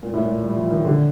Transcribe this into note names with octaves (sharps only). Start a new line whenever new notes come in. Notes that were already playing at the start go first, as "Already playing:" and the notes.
A#2
A2
A#2
G3
F3
D#3
D3